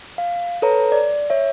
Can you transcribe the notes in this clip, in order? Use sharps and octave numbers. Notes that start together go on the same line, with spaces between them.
F5
A4 B4 C#5 A#5
D5
C#5 E5